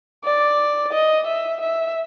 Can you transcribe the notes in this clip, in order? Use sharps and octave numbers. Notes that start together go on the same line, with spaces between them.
D5
D#5
E5
E5